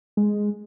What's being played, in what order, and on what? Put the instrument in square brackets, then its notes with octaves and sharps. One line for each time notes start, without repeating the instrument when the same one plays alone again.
[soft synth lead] G#3